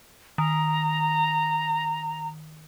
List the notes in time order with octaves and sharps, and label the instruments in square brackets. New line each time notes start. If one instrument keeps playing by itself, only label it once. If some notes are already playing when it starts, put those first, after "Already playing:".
[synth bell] D#3 [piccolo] A#5